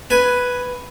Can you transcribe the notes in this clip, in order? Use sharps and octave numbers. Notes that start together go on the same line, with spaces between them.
B4 G#5